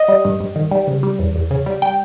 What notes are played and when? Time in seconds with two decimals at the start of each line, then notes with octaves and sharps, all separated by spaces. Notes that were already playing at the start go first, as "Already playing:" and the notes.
Already playing: D#5
0.08 G3
0.25 G2
0.40 G2
0.56 D#3
0.71 G3
0.87 C#3
1.03 G3
1.19 E2
1.35 E2
1.51 C#3
1.66 G3
1.82 G3 G5